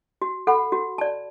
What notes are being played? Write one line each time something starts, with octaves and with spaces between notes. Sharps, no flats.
F#4
A4 F#5 B5
F#4
D5 A5